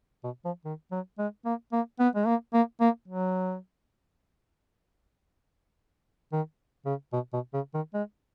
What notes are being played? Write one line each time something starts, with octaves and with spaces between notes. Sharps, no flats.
B2
F3
D#3
F#3
G#3
A#3
A#3
B3
G#3
A#3
A#3
A#3
F#3
D#3
C#3
B2
B2
C#3
D#3
G#3